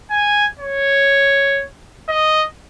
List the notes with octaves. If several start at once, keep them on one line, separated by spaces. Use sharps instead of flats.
G#5
C#5
D#5